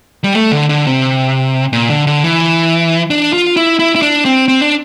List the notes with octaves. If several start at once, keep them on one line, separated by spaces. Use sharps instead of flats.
G3
A3
D3
D3
C3
A#2
D3
D3
E3
D4
F4
E4
E4
E4
D4
C4
C4
D4